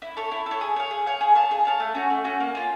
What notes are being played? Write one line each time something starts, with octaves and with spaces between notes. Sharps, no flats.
E4
A4 C#5
E4
A4 C#5
G#4
C#5 F5
G#4
C#5 F5
G#4
C#5 F5 A5
G#4
C#5 F5 A5
A3
C#4 F#4
A3
C#4 F#4
A#3
C#4 F4